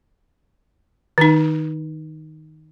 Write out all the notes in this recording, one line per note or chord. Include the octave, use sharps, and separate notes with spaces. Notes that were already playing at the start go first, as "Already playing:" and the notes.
D#3 D#4